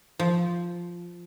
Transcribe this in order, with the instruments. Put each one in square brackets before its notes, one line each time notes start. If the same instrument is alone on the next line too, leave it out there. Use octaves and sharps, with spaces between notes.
[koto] F3